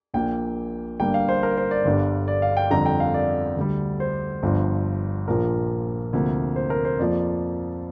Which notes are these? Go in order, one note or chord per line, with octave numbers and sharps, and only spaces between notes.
A#1 A#2 A#3 G5
G1 G2 G3 A#3 G5
F5
C5
A#4
C5
D5
G1 G2 D3 G3
D5
F5
G5
F2 D3 G3 A#5
G5
F5
D5
D2 D3 G3
C5
G1 G2 F3
A#1 A#2 F3 A#3 A#4
D2 C3 F3 A#3
C5
A#4
C5
F2 F3 A#3 D5